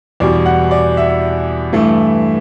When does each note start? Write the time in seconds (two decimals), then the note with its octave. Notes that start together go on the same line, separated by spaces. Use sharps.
0.20 E2 B2 G3 D5
0.46 F#5
0.71 D5
0.97 E5
1.73 G2 E3 A3